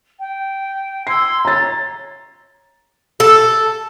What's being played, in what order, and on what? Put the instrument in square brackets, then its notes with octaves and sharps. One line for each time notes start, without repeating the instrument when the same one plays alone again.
[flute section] G5
[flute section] C6 E6 G#6 [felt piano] C7
[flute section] C#5 [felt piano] A#5 A6
[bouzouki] A4